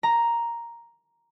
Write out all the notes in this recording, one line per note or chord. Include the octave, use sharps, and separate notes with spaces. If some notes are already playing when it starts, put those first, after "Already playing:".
A#5